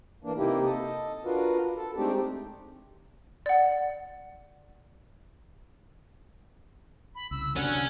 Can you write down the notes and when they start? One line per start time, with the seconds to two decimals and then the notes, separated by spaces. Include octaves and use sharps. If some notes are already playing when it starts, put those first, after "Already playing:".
0.24 E3 A#3 D4
0.37 C3 A#3 D#4 E4 G4
0.65 A4 D#5
1.25 D4 F4 F#4 A#4 B4
1.77 A4
1.96 G#3 A3 C4 D4 D#4 G4
3.46 D5 F#5
7.15 B5
7.31 C2 C#3 E6
7.56 D3 F#3 G3 C#4 F#5